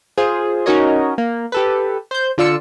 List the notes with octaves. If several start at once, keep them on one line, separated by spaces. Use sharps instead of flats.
F4 G#4 C5
C#4 D#4 F#4 A#4 C#5 D#5
A#3
G4 A4 B4
C5 G6
D3 F4 D5 E6 C#7